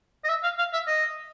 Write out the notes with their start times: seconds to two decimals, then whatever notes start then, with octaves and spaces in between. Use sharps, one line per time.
0.24 D#5
0.29 E5
0.43 F5
0.58 F5
0.73 E5
0.87 D#5